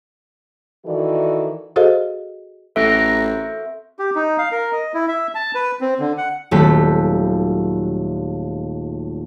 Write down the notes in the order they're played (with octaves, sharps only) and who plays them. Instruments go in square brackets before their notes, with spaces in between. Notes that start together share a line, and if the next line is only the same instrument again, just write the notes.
[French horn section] D#3 E3 F#4 A4 D5
[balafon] F#4 G#4 A4 C5 D#5 F5
[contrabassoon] A1 [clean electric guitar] C4 F#4 A#4 [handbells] A4 [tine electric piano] E5
[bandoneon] G4
D#4
F5
A#4
D#5
E4
E5
A5
B4
C4
D3
F#5
[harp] D#1 F#3 G3 A3 B3 B6